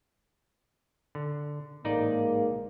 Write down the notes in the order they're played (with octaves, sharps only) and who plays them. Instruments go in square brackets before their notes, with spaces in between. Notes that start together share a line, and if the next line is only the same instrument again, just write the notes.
[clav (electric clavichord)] D3
[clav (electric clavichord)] A1 D#4 D5 [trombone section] G#2 A#3